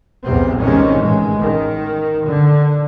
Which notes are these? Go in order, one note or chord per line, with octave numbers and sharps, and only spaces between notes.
B1 E2 C3 B3 C4
C3 D#3 E3 G#3 C#4
A1 G#3
D#3
D3